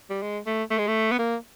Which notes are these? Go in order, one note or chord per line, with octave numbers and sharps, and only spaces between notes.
G3
G#3
A3
A3
G#3
A3
B3
A#3